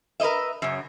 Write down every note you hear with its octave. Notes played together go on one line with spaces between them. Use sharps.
A#4 B4 C#5 D#5 E5
F#2 C#3